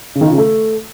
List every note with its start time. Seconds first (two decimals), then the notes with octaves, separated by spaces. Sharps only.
0.15 C#3
0.21 D#3
0.27 F4
0.32 C#3
0.38 A3